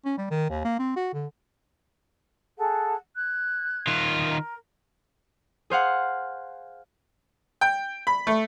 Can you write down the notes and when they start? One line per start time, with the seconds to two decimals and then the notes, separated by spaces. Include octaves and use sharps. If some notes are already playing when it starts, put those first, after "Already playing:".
0.05 C#4
0.18 G3
0.31 D#3
0.49 D#2
0.65 A#3
0.79 C4
0.96 F#4
1.13 D3
2.57 G#4 A4 F#5
3.17 F#6 G#6
3.87 D#3 F4
4.25 A#4
5.70 G#4 C5 F5 F#5
7.61 G5
8.07 B5
8.27 A3